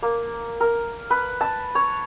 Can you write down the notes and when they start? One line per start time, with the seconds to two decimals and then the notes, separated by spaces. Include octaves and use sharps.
0.02 A#3
0.60 A#4
1.10 B4
1.41 A5
1.75 C#5